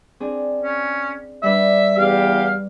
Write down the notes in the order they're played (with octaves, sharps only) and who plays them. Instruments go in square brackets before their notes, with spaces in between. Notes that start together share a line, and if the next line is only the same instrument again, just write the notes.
[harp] C4 D4 G#4
[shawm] C#4
[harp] G3 D4 B4 [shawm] E5
[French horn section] E2 G4 [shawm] F5